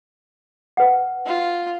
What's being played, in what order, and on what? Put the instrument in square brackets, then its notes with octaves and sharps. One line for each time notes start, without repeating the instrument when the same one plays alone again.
[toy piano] B4 F#5
[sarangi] F4